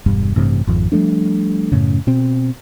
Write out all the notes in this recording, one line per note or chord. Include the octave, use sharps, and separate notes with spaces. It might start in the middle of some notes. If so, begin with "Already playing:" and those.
E1 G2
A1 G2 C3 C4
G#1 F2
F3 G3 A3 D4
F#2 A2 C#3
B2 C4